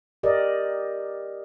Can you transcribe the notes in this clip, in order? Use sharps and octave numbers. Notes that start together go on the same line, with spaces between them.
G4 A#4 D5 D#5